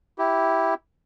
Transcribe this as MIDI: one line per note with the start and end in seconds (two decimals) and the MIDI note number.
0.18 0.74 64
0.18 0.74 67